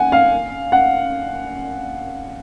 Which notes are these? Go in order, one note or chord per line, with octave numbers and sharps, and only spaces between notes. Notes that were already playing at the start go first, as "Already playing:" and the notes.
Already playing: F#5 G#5
F5
F#5